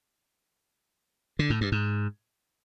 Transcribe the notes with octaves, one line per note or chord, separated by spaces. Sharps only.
D3
A2
G2
G#2